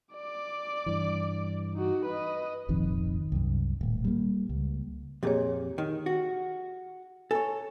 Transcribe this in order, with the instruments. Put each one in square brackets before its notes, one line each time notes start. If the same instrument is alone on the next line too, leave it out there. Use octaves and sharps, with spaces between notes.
[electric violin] D5 D6
[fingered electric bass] G2 E3
[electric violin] D#4 F#4
B4 D#5
[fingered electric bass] D#1 G#1 F2 D#3
C2 F#2
D#1 A2
G3 A#3
C#2
[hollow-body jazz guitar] F2 A#2 [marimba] G4 G#4 C#5
[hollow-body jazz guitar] D#3
F#4
[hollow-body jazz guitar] A4 C#5 [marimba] G#5